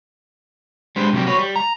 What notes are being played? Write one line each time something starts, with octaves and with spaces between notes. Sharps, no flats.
G3 G#3 D4 B4 C5
C3 F#3 G3 A#3 G4
F#4 B4 C#5
G3
A#5